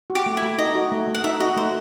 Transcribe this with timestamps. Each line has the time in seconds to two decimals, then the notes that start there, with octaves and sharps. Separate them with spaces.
0.10 F#4
0.15 G4
0.26 A3
0.37 E4
0.42 A3
0.59 D#4 D#5
0.75 F#4
0.92 A3
1.08 A3
1.15 F#5
1.24 D#4 E5
1.40 F#4 D#5
1.56 A3 C5